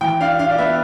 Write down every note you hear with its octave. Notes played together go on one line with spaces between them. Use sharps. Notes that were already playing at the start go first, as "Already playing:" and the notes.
E3 G5
D4 F5
D4 F5
D5
B3 E5